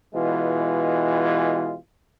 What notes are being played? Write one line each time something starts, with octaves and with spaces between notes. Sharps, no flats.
B2 E3 G#3 F4